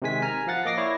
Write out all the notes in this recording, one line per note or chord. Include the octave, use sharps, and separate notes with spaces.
C3 D#3 G#3 G#5 B6
G#5 A#5 F6
F3 F5 F#5 A6
A#3 D#5 D6 A#6 C7
E4 C#5 D5